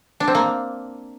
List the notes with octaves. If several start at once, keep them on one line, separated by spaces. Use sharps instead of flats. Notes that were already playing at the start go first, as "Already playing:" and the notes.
D4
C4
A#3